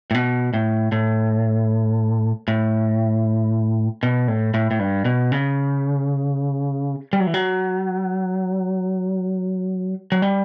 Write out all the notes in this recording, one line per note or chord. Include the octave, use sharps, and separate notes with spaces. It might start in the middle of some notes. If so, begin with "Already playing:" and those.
A2
B2
A2
A2
A2
B2
A2
A2
A2
G2
B2
C#3
G3
F#3
E3
F#3
F#3
G3